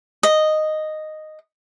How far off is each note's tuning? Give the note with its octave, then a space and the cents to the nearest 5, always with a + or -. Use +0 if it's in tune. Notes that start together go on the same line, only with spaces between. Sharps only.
D#5 -5